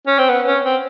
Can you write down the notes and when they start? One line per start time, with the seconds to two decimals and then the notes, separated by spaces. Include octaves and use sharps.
0.07 C#4
0.19 C4
0.29 B3
0.47 C#4
0.64 C4